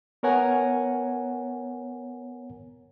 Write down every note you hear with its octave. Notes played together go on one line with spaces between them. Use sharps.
B3 A#4 C#5 F#5 G#5 A#5